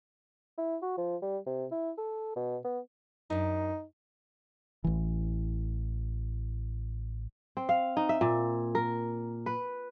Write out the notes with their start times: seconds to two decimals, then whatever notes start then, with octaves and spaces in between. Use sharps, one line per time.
0.58 E4
0.82 F#4
0.97 F3
1.22 G3
1.46 C3
1.71 E4
1.98 A4
2.36 B2
2.64 B3
3.30 F#2 D4 D#4
4.84 A1 E3
7.57 C4
7.69 F5
7.97 D#4
8.09 E5
8.21 A#2
8.75 A#4
9.46 B4